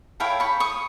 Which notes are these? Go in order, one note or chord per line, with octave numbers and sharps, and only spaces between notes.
E4 A4 C#5 F5 G5
B5 C#6
C#6 D#6